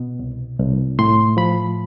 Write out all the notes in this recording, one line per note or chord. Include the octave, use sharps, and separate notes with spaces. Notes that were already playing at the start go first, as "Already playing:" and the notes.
Already playing: B2 B3
C2
C2
A2 C6
F3 B5